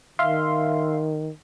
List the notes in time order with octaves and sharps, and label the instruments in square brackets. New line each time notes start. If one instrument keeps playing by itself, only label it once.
[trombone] D#3 [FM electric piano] E5 F5 C6